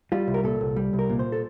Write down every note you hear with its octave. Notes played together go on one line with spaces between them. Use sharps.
G3 F4
C2
A#4
A#2 A4
C2
G3
C2
A#4
A#2
C5
A4